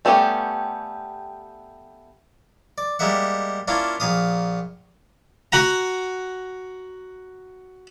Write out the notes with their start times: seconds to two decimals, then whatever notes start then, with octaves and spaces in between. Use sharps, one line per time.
0.05 G3 A3 B3 C#4 G4
2.78 D5
2.99 G3 G#3 A#3 E5 F#5
3.68 A#3 C#4 D4 E4 F4
4.00 A#1 A#2 F5 D#6
5.52 F#4 F#5 A#5